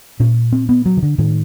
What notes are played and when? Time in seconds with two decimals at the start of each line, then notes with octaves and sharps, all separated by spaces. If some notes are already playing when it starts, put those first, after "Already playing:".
0.20 A#2 C#4
0.52 C4
0.69 B3
0.86 F#3
0.97 D#3
1.02 D3
1.18 A2 D#3